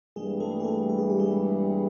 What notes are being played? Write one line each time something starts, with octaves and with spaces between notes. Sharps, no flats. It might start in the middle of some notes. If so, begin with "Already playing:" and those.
G2 E3 G3 G#3 A#3 G#4
A3 A4
G#4
A3 A4
A4
G#4
G4
G#3 G#4